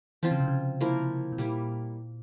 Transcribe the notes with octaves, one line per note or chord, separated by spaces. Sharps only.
E3 F3 C4 F4
C#3
C3
C#3
F3 A#3 E4 A#4
C3
A#2 G3 A#3 E4